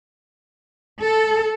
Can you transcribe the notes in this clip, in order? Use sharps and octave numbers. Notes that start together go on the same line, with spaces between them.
A4